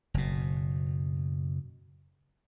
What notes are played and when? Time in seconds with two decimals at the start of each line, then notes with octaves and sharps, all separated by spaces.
0.14 F#1 B2